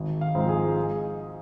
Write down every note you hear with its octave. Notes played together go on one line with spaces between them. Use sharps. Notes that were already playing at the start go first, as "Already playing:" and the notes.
Already playing: G#1
F5
G#2 F3 C4
G#4
G#4